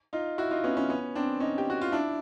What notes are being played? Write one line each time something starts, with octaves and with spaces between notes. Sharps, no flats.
D#4 F4
E4 F#4
D#4 F4
B3 C#4
B3 C#4
B3 C#4
C4 D4
C#4 D#4
G4
F#4
F4
D4 E4